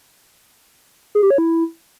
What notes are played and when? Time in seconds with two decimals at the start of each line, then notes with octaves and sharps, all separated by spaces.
1.15 G#4
1.23 G4
1.30 C#5
1.38 E4